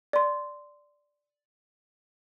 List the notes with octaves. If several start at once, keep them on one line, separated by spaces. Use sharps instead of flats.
D5 C6